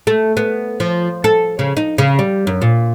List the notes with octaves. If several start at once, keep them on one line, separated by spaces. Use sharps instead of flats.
A3
B3
F3
A4
C#3
D#4
C#3
G3
F#2
A#2